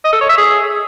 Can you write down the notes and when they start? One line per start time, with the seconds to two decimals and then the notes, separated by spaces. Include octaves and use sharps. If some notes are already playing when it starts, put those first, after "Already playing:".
0.04 D#5
0.13 A4
0.21 C#5
0.29 E5
0.38 G#4